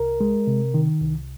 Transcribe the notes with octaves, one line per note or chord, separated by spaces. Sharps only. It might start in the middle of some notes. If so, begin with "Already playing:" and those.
Already playing: C2 A#4
G#3
C3
D#3
C2